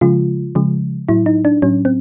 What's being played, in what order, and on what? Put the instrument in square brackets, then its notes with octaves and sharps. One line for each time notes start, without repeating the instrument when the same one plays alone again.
[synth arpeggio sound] C#3 F3 G#3 F4
C#3 F3 G#3
A2 F#3 E4
D#4
D4
A2 F#3 C#4
C4